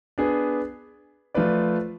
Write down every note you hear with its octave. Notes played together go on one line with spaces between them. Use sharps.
B3 D4 G#4
F3 A3 F4 B4 D5